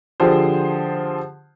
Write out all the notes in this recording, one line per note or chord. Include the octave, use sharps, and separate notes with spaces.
D3 F3 F4 G4 G#4 C5